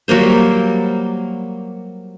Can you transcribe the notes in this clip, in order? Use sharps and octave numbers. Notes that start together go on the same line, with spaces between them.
F#3 G3 A#3 C5